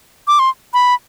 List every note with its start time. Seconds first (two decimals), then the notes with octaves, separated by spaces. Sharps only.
0.28 D6
0.39 C6
0.74 B5